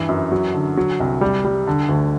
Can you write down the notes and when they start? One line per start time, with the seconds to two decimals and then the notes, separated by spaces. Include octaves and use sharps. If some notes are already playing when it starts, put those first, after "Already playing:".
Already playing: G2 E3
0.09 F#2
0.32 F#3
0.54 D3
0.77 F#3
1.00 C2
1.21 G3
1.45 G3
1.67 D3
1.89 D2